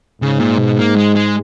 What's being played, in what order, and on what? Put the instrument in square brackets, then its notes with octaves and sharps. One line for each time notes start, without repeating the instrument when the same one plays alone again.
[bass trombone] G#2 [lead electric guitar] C#3
[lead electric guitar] A#2
B2
A#3
G#3
G#3